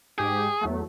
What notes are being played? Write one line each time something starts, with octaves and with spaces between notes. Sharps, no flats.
G#2 G4 G#4
E2 F#3 A3